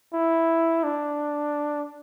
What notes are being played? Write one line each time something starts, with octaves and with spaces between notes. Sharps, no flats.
E4
D4